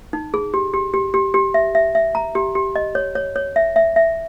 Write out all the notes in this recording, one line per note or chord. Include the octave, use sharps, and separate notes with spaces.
D#4
G#4
G4
G4
G4
G4
G4
E5
E5
E5
A#5
G4
G4
D#5
C#5
C#5
C#5
E5
E5
E5